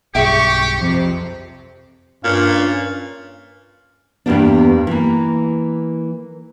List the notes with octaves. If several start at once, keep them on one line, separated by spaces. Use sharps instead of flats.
B1 G2 G4 G#4 E5 G5 C#6
F2 C3
G2 A#2 C#4 F5
E2 G2 G3 A#3 B3 D4
E3 A#3